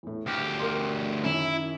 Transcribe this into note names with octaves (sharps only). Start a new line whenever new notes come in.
E2 A2
D2 G4 F6
A#4 A#5 C6
F#2 D#3 E4